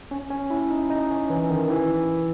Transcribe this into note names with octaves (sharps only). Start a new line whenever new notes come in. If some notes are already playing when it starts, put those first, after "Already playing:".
C#4
C#4
E4
D#4
D#4
C#4
E3
D#3
E3